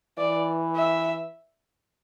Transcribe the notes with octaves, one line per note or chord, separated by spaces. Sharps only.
E3 D5
E5